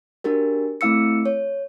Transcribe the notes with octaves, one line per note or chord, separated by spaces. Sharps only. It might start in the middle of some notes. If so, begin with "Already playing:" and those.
D4 F#4 G4 A#4
A3 C4 E4 F5 E6 C#7
C#5